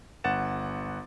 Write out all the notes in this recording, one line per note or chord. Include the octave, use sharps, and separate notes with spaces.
G1 F#5 A6 E7